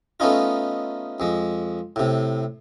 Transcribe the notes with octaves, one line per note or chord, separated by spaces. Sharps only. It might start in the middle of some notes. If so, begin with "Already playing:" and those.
A3 B3 C#4 D#4 F4
F2 G#3
A2 C3